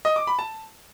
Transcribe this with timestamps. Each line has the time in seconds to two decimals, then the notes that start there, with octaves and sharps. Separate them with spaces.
0.05 D#5
0.16 D6
0.27 B5
0.39 A5